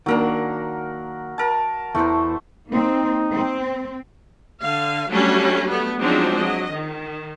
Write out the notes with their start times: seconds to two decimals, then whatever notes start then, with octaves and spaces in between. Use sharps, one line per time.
0.06 D#3 F#3 A#3 D4 A#4 F#5
1.38 A#4 A5
1.95 E2 E3 A3 B3 C5
2.68 A#3 C4 D#4
3.32 C4
4.62 D3 F5
5.10 F#3 G3 A3 C#4 D4
5.70 A3 B3
6.00 F3 F#3 G#3 C4 D4 D#4
6.38 F#3 D#5
6.73 D#3